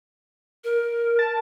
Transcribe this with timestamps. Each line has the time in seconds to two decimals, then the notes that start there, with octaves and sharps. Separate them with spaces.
0.64 A#4
1.19 A5